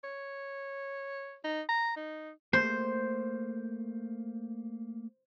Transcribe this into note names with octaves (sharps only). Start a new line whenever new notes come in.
C#5
D#4
A#5
D#4
A3 A#3 C5